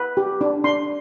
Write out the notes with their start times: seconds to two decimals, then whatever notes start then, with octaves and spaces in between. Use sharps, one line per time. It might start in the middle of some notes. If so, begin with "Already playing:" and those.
Already playing: B4
0.17 G4
0.41 D4
0.64 D4 C6